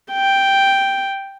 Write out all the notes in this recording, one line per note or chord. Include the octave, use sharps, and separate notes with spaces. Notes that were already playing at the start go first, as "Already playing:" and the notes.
G5